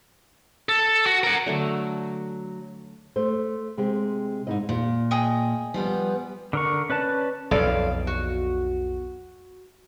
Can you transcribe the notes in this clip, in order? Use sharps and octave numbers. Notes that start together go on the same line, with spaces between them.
A4
F#4
A#4 F#5
D3 F#3 A3 D5
A3 C5
C3 G#3 C4 G4
G#2 C3 D#4 E4 D#5
A#2
G#4 D#5 G5
F3 G3 B3
D3 A#4 C#6
C#4 B4 D5 A5
B1 F2 A4 D5 F5
F#4